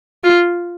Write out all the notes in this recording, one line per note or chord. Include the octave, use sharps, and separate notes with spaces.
F4